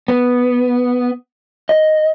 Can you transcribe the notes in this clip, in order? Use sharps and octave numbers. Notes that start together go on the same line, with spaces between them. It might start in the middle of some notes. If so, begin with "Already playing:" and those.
B3
D#5